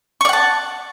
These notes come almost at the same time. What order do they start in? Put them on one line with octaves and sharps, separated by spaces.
C#6 D5 F#5 A5